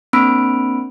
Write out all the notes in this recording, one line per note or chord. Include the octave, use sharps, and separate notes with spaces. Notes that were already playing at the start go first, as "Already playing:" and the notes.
A#3 C4 D4 B5 D7